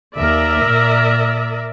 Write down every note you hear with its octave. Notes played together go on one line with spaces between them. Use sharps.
D#2 A#4 D5 E5
A#2